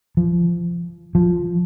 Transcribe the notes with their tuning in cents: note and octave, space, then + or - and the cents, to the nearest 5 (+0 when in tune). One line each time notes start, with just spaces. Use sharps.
F3 -25
F3 +5